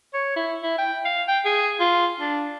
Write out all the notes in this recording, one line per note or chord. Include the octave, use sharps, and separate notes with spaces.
C#5
E4
E4
G5
F5
G5
G#4
F4
D4